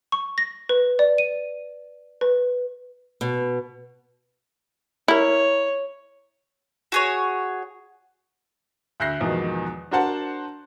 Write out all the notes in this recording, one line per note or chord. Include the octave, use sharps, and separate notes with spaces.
C#6
A#6
B4
D5
D#7
B4
B2
E4 A#4 C#5
F#4 G#4 C#5
D2 E5 F#6 G6 A#6 C7
E2 G#2 B2 D#3 F3
D4 F#4 A#4 C5 F#5 A5